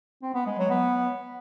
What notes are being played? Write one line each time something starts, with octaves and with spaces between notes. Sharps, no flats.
C4
B3
G#3
F#3
B3